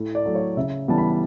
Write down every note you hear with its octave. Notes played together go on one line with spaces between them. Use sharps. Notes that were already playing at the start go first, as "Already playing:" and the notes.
Already playing: A2
D5
F#3 A3
C#5
C#3 E5
E3 G3 B3 A5
B5